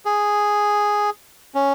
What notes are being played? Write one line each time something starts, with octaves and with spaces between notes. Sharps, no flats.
G#4
C#4